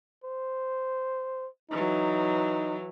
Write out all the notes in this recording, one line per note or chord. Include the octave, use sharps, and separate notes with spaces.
C5
E3 F#3 D#4